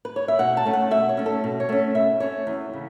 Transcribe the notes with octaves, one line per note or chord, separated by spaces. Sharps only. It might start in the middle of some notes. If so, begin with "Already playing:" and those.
B4
C#5
E5
B2 F#5
A5
A3 C#4
F#5
B2 E5
C#5
A3 C#4
A4
B2
C#5
A3 C#4
B2 E5
A3 C#4 C#5
E2
C#3